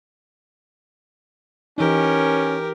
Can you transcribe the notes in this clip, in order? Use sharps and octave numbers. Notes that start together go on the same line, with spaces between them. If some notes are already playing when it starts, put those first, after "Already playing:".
E3 C#4 D#4 G4 A#4